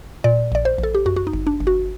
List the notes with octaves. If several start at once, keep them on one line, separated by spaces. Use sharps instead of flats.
A#2 D5
A#1 D5
C5
A#1
A4
G4
F#2 F#4
F#4
D#4
G1
D4
G1
F#4